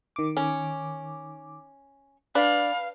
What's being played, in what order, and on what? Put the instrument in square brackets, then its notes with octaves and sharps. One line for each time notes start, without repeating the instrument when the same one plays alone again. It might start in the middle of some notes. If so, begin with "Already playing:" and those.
[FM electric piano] D#3 D6
[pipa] C#4
[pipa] D4 [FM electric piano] B4 [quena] F5